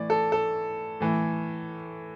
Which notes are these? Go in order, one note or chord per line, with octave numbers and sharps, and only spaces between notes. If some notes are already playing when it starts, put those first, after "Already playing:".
Already playing: A2 E3 D5
A4
A4
A2 E3